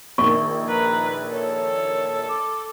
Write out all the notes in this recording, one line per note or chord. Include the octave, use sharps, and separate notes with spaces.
A#1 D#3 C#6
B4 A#5
A4 C#5
D6